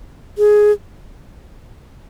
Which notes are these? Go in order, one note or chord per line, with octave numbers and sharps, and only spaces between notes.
G#4